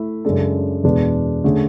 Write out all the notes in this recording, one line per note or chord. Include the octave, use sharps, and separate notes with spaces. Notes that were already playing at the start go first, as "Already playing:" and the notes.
Already playing: A3 E4 A4 E5
F#2 C#3 G#3 D4 A4
E2 B2 G#3 D4
D3 A3 C#4 G#4